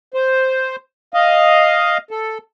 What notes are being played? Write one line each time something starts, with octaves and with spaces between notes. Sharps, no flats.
C5
D#5 F5
A4